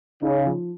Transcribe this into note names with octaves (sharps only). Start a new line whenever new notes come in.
C#3 D#4
F3